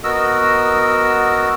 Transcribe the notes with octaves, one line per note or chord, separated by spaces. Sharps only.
B3 F#4 A#4 D#5 E6